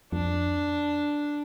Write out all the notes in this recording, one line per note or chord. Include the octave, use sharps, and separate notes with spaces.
F2 D4